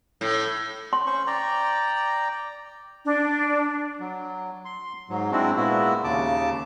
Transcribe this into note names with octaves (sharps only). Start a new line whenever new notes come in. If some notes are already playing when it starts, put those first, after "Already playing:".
A2
C6
C#4 C5 C#6
D5 G5 A#5
D4
F#3
C6
G#2 F#3
G#3 C4 D4 E4 F#4
A#2 G#3 B3 E4 F#4
D#2 C#3 A5 D6